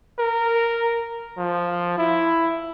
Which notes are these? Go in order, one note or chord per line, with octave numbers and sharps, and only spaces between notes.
A#4
F3
E4